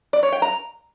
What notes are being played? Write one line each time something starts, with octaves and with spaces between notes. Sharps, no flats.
D5
C#5
G5
A#5